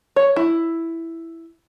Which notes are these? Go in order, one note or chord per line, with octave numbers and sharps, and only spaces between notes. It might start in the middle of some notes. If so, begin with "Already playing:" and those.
C#5
E4